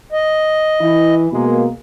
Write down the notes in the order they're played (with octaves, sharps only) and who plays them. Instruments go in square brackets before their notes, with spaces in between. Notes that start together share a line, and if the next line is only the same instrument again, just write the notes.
[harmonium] D#5
[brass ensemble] E3 E4
B2 G#3 A#3